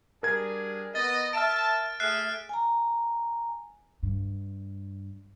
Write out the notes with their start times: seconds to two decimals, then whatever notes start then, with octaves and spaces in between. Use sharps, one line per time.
0.23 G3 D4 G#4 A#4 G#6
0.95 B3 D#5 A6
1.33 E5 A5 F6 D7
2.00 A3 G#4 E5 F6 F#6 C7
2.49 G#5 A#5
4.03 G2